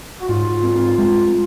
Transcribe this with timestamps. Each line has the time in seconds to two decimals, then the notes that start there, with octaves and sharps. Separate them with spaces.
0.21 F#4
0.29 G#2 F4
0.63 C4
0.98 G#3